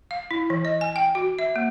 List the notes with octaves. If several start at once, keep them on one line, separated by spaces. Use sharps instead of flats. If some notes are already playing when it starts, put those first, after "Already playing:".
F5
E4
E3
D#5
G#5
G5
F#4
E5
A#3